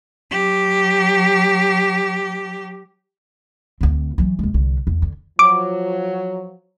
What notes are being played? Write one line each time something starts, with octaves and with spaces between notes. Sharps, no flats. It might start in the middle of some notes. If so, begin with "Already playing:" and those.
F#3 G4
D2 C4
E3 F#3
D#2 G#3
C2 D3
E2
D3
F3 F#3 D6